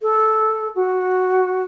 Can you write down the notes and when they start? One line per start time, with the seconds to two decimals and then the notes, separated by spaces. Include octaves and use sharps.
0.02 A4
0.75 F#4